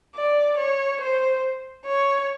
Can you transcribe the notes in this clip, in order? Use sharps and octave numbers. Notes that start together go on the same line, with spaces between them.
D5
C#5
C5
C#5